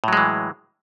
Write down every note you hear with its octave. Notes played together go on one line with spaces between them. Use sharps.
A2 E3 F#3 G#3